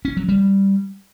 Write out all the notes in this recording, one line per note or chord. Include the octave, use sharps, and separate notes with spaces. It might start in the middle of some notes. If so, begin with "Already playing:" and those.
C#4
F#3
G3